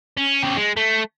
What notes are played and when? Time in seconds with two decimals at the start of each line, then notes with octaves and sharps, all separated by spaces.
0.17 C#4
0.42 C#3 G4
0.57 G#3
0.77 A3